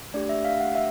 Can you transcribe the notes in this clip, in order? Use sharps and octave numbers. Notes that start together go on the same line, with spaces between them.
A3 D4 G4 D5
E5
F5
F#5
E5